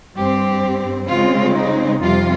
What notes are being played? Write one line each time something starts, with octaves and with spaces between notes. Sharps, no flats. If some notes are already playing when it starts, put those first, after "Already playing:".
G2 G3 C4 G4
C#3 G#3 C4 F4
D#4
F2 C3 G3 F4